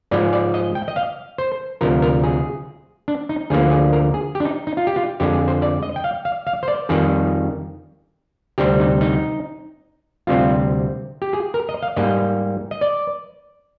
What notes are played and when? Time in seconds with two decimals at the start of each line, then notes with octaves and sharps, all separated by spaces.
0.11 G#2 F3 G#3 D5
0.33 D5
0.54 D#5
0.75 G5
0.88 D#5
0.96 F5
1.38 C5
1.81 D2 C3 F3 A#4
2.02 A#4
2.23 G#4
3.08 D4
3.29 D#4
3.50 D2 D3 F3 A#3 G#4
3.71 G#4
3.93 A#4
4.14 G#4
4.35 G4
4.40 D4
4.45 D#4
4.67 D#4
4.77 F4
4.87 G4
4.96 F4
5.20 F2 D3 G#3 G4
5.33 G#4
5.48 C5
5.62 D5
5.83 D#5
5.96 G5
6.04 F5
6.25 F5
6.47 F5
6.63 C5
6.68 D5
6.89 F2 D#3 G3 G#4
8.58 D2 C3 G3 C4 G4
8.80 D#4
9.01 D#4
10.27 D2 C3 G3 C4 F4
11.22 G4
11.33 G#4
11.54 A#4
11.69 D#5
11.82 F5
11.96 G#2 G3 A#3 D#5
12.71 D#5
12.81 D5